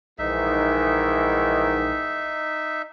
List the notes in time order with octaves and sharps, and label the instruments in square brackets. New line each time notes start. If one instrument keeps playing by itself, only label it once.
[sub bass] A#1 [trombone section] G#2 D#3 E3 [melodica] D#4 E5